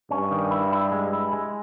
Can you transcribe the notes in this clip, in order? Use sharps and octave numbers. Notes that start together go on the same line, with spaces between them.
G2 C#4
D#3
E4
E4
G#3
E4
G#3